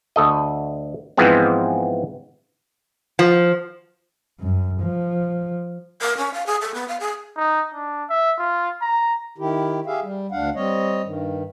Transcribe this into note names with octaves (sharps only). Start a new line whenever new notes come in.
D2 A4 D#5
G#2 E3 F3 G#3 B3 C4
F3
F#2
F3
A#4
C#4
F5
G#4
A4
B3
F5
G#4
D#4
D4
E5
F4
A#5
D#3 E4 G4
G4 G#4 E5 F5
G3
D2 D4 F5 F#5
G3 C4 C#5 D#5
G2 D#3